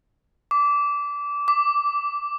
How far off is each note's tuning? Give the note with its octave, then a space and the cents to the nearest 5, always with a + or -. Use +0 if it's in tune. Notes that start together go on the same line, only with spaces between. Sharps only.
D6 -20
D6 -5